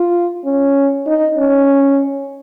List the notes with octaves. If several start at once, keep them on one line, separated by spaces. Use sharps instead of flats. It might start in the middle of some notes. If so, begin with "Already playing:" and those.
Already playing: F4
C#4
D#4
C#4